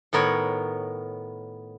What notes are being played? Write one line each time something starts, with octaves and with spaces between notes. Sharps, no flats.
A2 D#3 B3 A#4 C#5